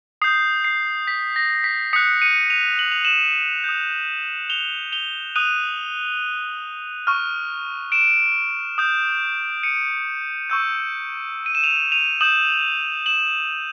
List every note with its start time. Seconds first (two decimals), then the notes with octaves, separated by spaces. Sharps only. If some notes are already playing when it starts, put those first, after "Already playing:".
0.22 D#6 G6 C7
0.64 C7
1.08 B6
1.36 A#6
1.64 B6
1.93 D#6 F#6 B6 C#7
2.21 C#7 D#7
2.50 D#7 F7
2.79 F#7
2.92 F7
3.05 E7 F#7
3.64 D#6 G6
4.50 F7 G7
4.92 F7 G7
5.35 D#6 F#6 D#7 F7
7.07 C#6 F6
7.92 D7 E7
8.78 D#6 G6
9.63 C#7 D#7
10.50 C#6 E6 G6
11.46 D#7
11.55 E7
11.63 D#7 F7
11.92 D#7 F7
12.21 D#6 G6 E7 F#7
13.06 E7 F#7